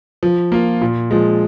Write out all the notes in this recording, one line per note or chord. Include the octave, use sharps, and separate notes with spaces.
F3
A#3 F4
A#2
F3 G#3